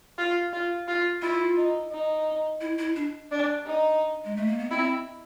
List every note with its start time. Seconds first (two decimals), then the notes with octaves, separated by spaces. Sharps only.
0.18 F4
0.53 F4
0.88 F4
1.22 E4 F4
1.57 D#4
1.92 D#4
2.61 E4
2.78 E4
2.96 D4
3.31 D4
3.66 D#4
4.25 G#3
4.36 A3
4.47 A#3
4.59 B3
4.70 C4 E4